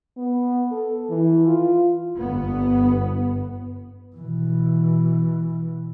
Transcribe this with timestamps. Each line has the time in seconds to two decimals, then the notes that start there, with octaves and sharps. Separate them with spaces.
0.17 B3
0.72 A4
1.10 E3
1.47 F4
2.17 G1 B3
4.16 B2 E3